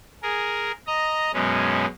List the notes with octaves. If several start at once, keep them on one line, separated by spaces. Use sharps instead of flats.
G#4 A#4
D#5 A#5
F#2 B2 G#3 C#4